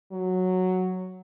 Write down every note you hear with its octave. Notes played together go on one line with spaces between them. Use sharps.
F#3